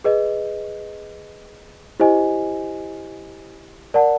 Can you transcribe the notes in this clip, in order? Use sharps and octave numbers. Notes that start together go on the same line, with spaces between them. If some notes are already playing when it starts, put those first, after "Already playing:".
G#4 B4 D#5
E4 G4 C5 D#5 G#5
A#4 D5 F#5 A5